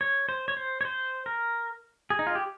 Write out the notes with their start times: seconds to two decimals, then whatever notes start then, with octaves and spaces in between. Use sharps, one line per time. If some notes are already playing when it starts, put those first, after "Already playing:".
0.01 C#5
0.29 C5
0.48 C#5
0.57 C5
0.81 C#5
0.85 C5
1.26 A#4
2.10 G#4
2.19 D#4
2.27 F4
2.35 G4